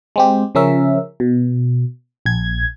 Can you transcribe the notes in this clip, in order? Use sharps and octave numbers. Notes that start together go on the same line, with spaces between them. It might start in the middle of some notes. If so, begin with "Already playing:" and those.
G#3 C4 G4
C#3 F3 C#4 A#4 E5
B2
A#1 G#6